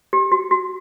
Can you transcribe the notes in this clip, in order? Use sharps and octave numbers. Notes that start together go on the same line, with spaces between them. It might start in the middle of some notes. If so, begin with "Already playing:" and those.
G4
F#4
F#4